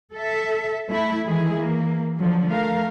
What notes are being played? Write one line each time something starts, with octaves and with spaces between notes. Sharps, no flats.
A4 E5
A3 E4
D#3 E3 G#3 E4 G#4
E3 A#3
D3 F3 F#3
A3 A#4 F5